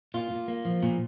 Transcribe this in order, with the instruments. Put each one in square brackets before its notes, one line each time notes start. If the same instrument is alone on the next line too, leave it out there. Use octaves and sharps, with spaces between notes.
[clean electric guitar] A#2 F4
A#2
A#3
F3
A#2